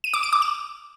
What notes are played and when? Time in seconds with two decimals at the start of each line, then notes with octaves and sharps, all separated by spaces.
0.04 D#7
0.14 D6
0.23 D7
0.33 D6
0.42 E7